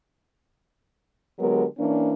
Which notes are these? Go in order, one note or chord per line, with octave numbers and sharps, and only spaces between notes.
D3 F#3 G#3 B3 G4 A#4
E3 A#3 C#4 D4